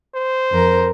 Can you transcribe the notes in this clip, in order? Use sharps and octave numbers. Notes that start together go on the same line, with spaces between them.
C5
F2 A#4